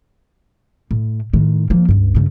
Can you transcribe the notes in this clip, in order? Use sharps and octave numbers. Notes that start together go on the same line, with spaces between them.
A2
A2 D#3
F3 A#3
C#2 G2
G2 C#3